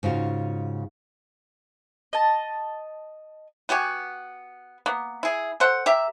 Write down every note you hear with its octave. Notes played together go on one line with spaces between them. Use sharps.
G#2 C#3 F4 F#4
D#5 A5
B3 F#4 G4 G#5
A#3 B3
E4 G#4
A4 C5 F#5
G4 A#4 E5